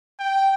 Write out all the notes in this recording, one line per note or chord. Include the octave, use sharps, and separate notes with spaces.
G5